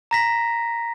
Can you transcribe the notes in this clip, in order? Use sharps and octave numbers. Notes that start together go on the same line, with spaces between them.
A#5 A#6 B6